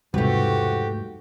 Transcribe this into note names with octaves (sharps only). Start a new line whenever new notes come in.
E1 G#2 C3 F3 A3 F#4 G4 B4